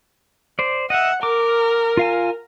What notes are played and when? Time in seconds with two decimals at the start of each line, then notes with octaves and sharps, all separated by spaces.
0.59 C5 D5
0.90 D#5 E5 F#5
1.23 A#4 D6
1.97 F4 F5 G#5